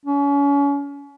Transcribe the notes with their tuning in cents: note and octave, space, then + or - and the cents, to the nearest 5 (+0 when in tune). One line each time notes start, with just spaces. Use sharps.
C#4 +35